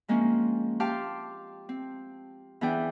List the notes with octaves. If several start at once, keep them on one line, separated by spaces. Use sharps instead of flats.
F3 G#3 A#3 C4 C#4
G4 F5 G5 A5 C6 D6
C4
E3 B3 D4 G#4 G5